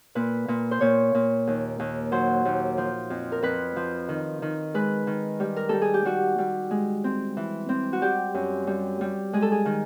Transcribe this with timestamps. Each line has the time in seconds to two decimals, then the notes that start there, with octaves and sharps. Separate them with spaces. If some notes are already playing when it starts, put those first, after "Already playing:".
0.15 A#2 B4
0.48 A#2
0.71 C5
0.81 A#2 C#5
1.15 A#2
1.47 D#2
1.80 D#2
2.12 F#3 C5
2.45 D#2
2.78 F3
3.10 F2
3.32 A#4
3.42 F2 B4
3.76 F3
4.09 D#3
4.42 D#3
4.74 G#3 B4
5.07 D#3
5.40 G3
5.56 A#4
5.69 G3 A4
5.82 G#4
5.94 G4
6.05 G3 F#4
6.38 G3
6.71 G#3
7.04 C4
7.37 E3
7.69 C4
7.93 F#4
8.02 G3 G4
8.34 F#2
8.67 G3
9.01 G3
9.33 G#3 G#4
9.42 A4
9.52 G#4
9.65 D#3